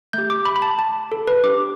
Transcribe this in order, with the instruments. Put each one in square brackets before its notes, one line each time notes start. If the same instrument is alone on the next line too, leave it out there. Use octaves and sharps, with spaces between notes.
[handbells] A3 G4 G6
D6
B5
B5
A5
A5
A4
B4
D4 G4 D6